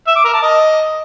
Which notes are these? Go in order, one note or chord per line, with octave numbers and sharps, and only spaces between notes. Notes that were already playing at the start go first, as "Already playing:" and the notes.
E5
D6
A#4
A5
D#5